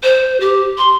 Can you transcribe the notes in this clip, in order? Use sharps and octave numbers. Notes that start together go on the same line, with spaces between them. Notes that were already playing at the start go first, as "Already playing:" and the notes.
C5
G4
C6